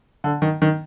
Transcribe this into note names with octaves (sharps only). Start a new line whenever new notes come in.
D3
D#3
D#3